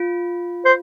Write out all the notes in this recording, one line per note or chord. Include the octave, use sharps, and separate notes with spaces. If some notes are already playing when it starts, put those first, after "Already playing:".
Already playing: F4
C5